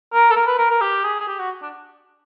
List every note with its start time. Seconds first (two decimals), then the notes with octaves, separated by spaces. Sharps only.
0.13 A#4
0.30 A4
0.36 A#4
0.47 B4
0.58 A#4
0.70 A#4
0.81 G4
1.04 G#4
1.20 G#4
1.28 G4
1.39 F#4
1.62 D4